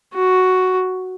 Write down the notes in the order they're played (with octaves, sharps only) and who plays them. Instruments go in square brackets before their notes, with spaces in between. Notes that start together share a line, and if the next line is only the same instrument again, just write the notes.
[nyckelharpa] F#4